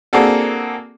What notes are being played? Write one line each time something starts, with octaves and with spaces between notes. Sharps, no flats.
A#3 C4 D4 F#4 G#4 A4